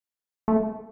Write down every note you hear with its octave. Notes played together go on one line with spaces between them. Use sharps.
A3